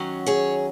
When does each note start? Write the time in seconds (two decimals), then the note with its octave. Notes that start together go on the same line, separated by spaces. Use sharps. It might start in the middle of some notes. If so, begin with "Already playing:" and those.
Already playing: D#3 F#3 C#4 F#5
0.26 G#4 C#5